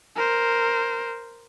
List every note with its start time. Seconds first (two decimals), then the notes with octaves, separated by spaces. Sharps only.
0.16 A#4 C5